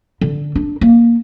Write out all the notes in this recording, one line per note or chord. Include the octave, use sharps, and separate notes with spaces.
D3
D4
A#3